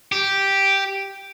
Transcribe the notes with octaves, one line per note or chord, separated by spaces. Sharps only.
G4